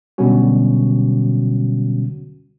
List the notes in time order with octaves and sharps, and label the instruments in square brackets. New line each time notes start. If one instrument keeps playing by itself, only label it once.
[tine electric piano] B2 D3 F#3 G3 C#4 F#4